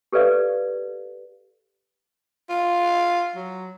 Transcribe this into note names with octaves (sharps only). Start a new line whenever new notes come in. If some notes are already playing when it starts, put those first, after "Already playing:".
G4 A4 B4 D5 F5
F4
F#3